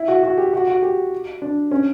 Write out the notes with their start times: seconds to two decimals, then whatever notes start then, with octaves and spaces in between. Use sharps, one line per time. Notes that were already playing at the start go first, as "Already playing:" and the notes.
Already playing: E4
0.08 F#4
0.23 F#4
0.38 G4
0.53 F#4
0.67 F#4
0.82 G4
1.42 D4
1.71 C#4